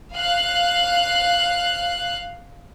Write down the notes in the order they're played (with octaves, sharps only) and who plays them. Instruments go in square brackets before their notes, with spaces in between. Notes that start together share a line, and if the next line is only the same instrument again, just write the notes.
[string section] F5 F#6